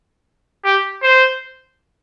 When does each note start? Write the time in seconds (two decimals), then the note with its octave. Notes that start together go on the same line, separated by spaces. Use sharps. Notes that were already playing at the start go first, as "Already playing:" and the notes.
0.65 G4
1.03 C5